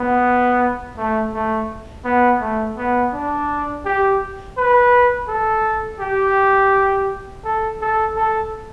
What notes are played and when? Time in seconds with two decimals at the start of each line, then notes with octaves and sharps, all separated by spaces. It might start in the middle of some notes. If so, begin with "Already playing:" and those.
Already playing: B3
0.97 A3
1.34 A3
2.05 B3
2.41 A3
2.77 B3
3.13 D4
3.85 G4
4.58 B4
5.29 A4
6.00 G4
7.44 A4
7.81 A4
8.17 A4